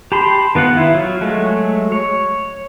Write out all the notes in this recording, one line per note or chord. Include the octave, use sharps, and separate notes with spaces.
G4 A5 B5 C6
D#3 B3 F4 F#5
E4
F#3 F4
F#3 G#3 A3
C#5